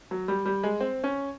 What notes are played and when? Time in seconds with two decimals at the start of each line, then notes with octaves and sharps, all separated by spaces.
0.11 F#3
0.28 G3
0.46 G3
0.63 G#3
0.80 C4
1.04 C#4